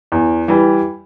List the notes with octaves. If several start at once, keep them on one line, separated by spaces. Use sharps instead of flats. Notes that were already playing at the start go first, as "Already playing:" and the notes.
E2
E3 G3